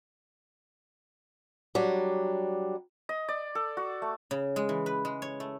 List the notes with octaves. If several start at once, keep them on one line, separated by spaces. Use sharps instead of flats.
F#3 G3 D4
D#5
D5
A4
F#4
A3
C#3
G#3
E3
B4
G#3
C#5
A3